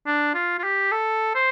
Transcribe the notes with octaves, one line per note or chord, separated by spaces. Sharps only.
D4
F4
F4
G4
A4
C5